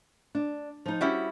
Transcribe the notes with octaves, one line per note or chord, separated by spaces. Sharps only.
D4
F3 D#4
G3 C#4 E4 F#4 C5 F#5